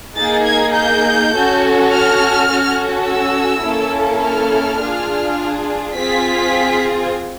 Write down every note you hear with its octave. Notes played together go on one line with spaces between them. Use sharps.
A#3 D#4 G#4 A6
G#6
G6
C#4 F#4 A4
F6
C#4 F#4 A4
E6
A#3 C#4 E4 A4
F6
D4 F4 G#4
C4 F4 G#4 B6